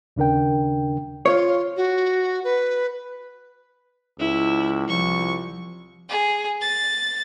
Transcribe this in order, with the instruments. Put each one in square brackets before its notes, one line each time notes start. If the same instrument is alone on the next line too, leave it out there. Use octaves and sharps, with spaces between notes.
[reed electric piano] D#2 C#3 D4 A#4 G5
[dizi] F4 [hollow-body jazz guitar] C#5
[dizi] F#4
B4
[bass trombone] C#2 [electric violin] E4
[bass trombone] C2 [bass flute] F3 [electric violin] C#6
[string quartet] G#4
A6